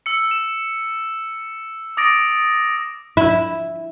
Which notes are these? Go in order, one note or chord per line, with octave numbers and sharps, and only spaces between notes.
E6 C#7
E7
D6 D#6 A6 A#6 D7
E4